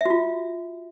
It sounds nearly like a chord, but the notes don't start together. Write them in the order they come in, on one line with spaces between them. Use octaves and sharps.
E5 F#4 F4